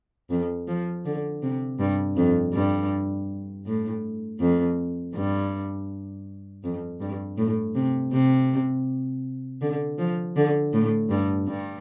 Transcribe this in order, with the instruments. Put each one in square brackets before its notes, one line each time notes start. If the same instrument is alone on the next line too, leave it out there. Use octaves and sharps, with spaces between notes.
[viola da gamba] F2
F3
D3
C3
G2
F2
G2
A2
F2
G2
F2
G2
A2
C3
C3
D3
F3
D3
A2
G2
G2